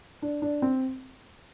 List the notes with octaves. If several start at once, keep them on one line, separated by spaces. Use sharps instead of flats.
D4
D4
C4